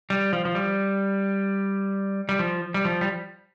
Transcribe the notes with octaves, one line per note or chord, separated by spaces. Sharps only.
G3
F3
F3
G3
G3
F3
G3
F3
G3